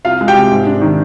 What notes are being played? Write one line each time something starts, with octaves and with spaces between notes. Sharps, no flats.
C2 F4 F5
G#3
G4 G5
C3
G#2
D4
D#3